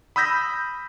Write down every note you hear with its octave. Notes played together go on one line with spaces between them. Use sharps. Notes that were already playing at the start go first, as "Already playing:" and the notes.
B5 D#6 E6 G6 A#6 B6